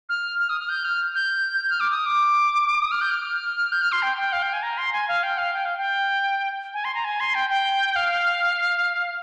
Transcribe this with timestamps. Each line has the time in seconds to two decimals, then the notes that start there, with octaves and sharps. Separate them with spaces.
0.09 F6
0.40 F6
0.50 D#6
0.60 F6
0.69 G6
0.85 F6
1.15 G6
1.61 G6
1.70 F6
1.80 D6
1.91 D#6
2.06 D6
2.81 D#6
2.91 F6
3.01 G6
3.11 F6
3.72 G6
3.82 F6
3.92 C6
4.02 G5
4.17 G5
4.33 F5
4.43 G5
4.53 G#5
4.63 A#5
4.78 C6
4.93 G#5
5.08 F5
5.23 G5
5.38 F5
5.54 G5
5.65 F5
5.78 G5
6.74 G#5
6.85 C6
6.95 A#5
7.05 G#5
7.20 C6
7.35 G5
7.50 G5
7.96 F5